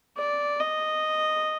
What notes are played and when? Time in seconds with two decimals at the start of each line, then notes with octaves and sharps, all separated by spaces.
0.18 D5
0.60 D#5